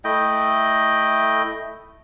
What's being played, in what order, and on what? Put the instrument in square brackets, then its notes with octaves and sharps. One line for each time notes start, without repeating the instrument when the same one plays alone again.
[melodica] A3 E4 D#5 G5